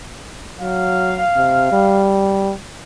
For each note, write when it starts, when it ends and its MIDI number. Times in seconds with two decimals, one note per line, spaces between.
0.60 1.25 54
0.60 2.08 77
1.36 1.67 48
1.72 2.53 55